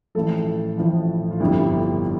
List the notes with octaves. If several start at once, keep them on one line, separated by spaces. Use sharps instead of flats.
A1 A2 F3 A4
A1 A2 F3
F4
G1 F2 D3 G3 E4